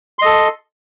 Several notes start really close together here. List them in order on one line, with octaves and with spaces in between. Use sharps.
C6 D#5 A4